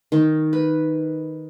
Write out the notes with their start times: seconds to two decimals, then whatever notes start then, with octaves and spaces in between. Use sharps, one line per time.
0.12 D#3
0.53 B4